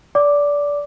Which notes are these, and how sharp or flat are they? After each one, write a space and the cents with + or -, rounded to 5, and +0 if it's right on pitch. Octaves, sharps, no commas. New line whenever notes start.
D5 -20 D6 +0